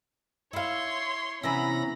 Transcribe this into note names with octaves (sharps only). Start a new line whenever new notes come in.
E4 C#5 F5 C6
C3 E3 B3 C#4 E4 A#5 B5 A#6